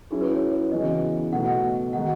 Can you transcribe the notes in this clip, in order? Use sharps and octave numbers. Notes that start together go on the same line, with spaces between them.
F#3 C#4 E4 G#4
B4
C#5
C#3 E3 B3 F#4 D#5
B2 A3 D#4 F#5
D#3 G#3 D#4 F#4 F#5